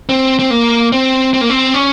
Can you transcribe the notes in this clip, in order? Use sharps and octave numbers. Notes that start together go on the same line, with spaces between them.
C4
C4
A#3
C4
C4
A#3
C4
C#4